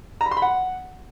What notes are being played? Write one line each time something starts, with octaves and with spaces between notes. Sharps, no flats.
A#5
B5
C6
B5
F#5